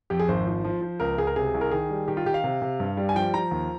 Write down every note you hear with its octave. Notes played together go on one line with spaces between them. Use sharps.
F2 G4
G#4
G#1 C5
F3
F3
F3
C#2 A#4
C#2 G#4
A#4
C3 G#4
C2
A#4
D#3 G#4
G3
D#3 G4
F4
D#3 G4
F5
C3
C3
G2
G3
G#5
F3 G5
F3 A#5
D#2